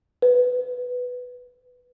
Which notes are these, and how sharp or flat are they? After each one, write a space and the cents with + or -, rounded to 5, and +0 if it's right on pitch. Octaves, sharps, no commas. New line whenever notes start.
B4 +5